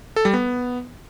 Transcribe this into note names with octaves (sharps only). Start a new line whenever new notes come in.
A4
G3
B3